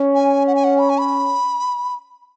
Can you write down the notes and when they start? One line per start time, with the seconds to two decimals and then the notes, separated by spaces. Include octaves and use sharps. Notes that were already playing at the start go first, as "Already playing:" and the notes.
Already playing: C#4
0.15 G#5
0.47 F#5
0.55 G#5
0.64 F#5
0.79 B5
0.89 G#5
0.99 B5